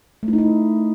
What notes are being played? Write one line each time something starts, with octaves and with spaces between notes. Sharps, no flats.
A3
E4
D#4
E4